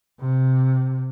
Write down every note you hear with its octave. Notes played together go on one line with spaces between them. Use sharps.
C3